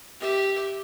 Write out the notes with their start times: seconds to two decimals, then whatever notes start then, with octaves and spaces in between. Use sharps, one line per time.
0.20 G4 E5